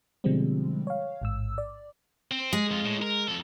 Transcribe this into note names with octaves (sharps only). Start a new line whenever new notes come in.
B2 D3 F3 G3 G#3 C4
C#5 F5
A1 G#2 E6
D5
C4
G#3 G#4
F2 F4
A2
A#4
F2 A4